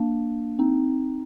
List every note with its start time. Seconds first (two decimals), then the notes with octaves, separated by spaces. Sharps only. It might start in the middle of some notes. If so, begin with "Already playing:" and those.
Already playing: A#3 D4
0.59 C4 D#4